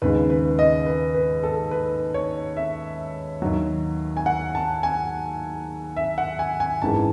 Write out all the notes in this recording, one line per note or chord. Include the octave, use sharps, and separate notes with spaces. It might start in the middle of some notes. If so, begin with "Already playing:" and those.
D#2 C#3 G#3 B4
B4
D#5
B4
B4
A4
B4
C#5
E5
D#2 D#3 F#3
G#5
F#5
A5
G#5
E5
F#5
G#5
G#5
G#1 F#2 E3 G#3 A5